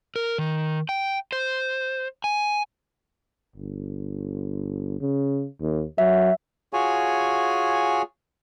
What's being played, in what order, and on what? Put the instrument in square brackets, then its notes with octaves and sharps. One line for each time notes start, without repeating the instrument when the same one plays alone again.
[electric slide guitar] A#4
D#3
G5
C5
G#5
[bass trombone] G1
C#3
D#2
[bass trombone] F#3 [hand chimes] E5
[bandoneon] F4 F#4 G#4 C#5 G#5